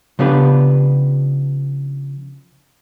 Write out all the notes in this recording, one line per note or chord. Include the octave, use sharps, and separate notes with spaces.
C#3 F3 B3 D4 G4 B4